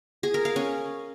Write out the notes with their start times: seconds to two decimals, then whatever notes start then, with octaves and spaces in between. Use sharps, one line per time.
0.23 G#4
0.34 A#4
0.45 F5
0.56 C#4